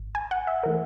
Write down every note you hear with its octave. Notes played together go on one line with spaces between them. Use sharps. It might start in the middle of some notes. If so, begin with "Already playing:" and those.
Already playing: G#1
G#5
F#5
E5
E3 A3 A#4